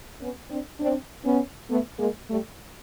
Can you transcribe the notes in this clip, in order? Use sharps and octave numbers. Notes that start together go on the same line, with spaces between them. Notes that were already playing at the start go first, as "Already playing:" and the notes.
B3 C#4
C4 D4
C4 D4
B3 C#4
A3 B3
G#3 A#3
G3 A3